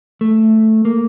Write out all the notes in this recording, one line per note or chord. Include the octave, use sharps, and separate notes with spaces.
A3
A#3